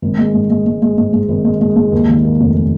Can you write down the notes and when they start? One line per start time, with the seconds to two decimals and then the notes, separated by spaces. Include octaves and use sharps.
0.02 G#1
0.19 G#3
0.34 G#2
0.50 G#3
0.66 G#2
0.82 G#3
0.98 G#2
1.13 G#2
1.28 G#1
1.45 G#3
1.61 G#3
1.76 G#2
1.92 D#2
2.09 D#3
2.24 A#3
2.40 F1